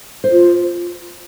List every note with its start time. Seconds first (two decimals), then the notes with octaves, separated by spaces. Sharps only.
0.24 C5
0.31 F4